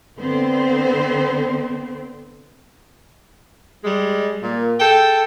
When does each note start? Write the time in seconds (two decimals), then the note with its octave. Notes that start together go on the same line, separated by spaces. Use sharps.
0.20 D3 B3 C4 C5
3.83 G3 G#3
4.41 A#2
4.80 G#4 A4 G5